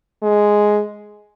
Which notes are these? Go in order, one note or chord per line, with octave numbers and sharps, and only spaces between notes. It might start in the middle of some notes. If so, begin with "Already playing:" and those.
G#3